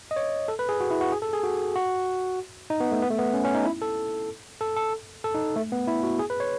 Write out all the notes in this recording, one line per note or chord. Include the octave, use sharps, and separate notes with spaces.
D#5
C#5
A4
B4
G#4
F#4
E4
F#4
G#4
A4
G#4
F#4
F#4
D#4
B3
A3
B3
A3
B3
C#4
C#4
D#4
E4
A4
A4
A4
A4
D#4
A3
B3
E4
F#4
G#4
B4
C#5